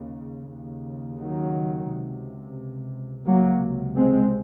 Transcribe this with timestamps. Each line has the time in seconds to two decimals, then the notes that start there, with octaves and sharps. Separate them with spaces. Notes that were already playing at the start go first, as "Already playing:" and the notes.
Already playing: D#2 C#3
0.49 D#2 C#3
1.18 D#3 F#3
1.88 C#2 C3
3.26 C#2 C3 F#3 A#3
3.95 G#3 C4